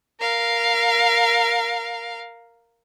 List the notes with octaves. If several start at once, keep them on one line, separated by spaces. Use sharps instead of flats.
A#4 F5